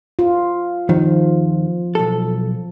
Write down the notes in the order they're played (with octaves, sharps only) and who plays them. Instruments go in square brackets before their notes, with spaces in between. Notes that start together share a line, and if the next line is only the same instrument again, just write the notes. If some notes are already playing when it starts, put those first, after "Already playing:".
[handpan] F4
[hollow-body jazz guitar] D#2 D#3 [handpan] F3
[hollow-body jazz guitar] B1 A4